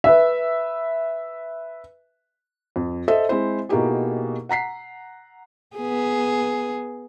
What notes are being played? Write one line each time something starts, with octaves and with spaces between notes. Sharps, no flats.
B4 E5
F2
A4 C5 D#5 E5
G#3 C4 E4 C5
B2 A#3 D#4 E4 G4 G#4
F#5 A#5 B6 C7
B3 G#4